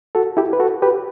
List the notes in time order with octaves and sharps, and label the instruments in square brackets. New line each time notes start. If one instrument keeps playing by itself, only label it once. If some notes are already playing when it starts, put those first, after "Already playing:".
[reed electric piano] F#4 A4
E4 G4
B4
F#4 A4
G4 B4